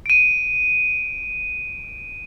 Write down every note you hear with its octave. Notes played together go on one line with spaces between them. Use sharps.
D7 D#7